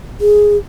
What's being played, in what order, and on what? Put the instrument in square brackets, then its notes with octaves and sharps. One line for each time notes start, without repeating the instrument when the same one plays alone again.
[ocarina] G#4